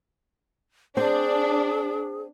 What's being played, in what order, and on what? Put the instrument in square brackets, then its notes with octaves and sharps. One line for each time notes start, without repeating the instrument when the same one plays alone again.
[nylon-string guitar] C4 [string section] D4 [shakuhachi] G#4